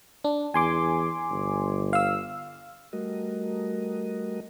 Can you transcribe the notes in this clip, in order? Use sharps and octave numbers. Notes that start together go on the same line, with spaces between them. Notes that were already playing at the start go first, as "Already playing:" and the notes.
D4
E2 G#5 C6 D6
G1
F5 E6
G3 A3 F#4 A#4 D#5